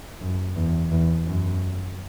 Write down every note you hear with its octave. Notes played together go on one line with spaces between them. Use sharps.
F#2
E2
E2
F#2